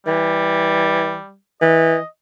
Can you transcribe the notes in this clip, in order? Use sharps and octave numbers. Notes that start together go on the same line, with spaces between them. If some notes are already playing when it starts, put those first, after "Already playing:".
E3 G3
E3 D#5